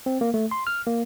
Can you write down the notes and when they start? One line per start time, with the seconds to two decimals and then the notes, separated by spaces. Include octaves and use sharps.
0.06 C4
0.21 A#3
0.34 A3
0.51 C6
0.67 F6
0.87 A#3